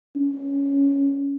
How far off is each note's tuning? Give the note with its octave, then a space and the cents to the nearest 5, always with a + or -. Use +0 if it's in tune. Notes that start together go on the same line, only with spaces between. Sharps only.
C#4 +10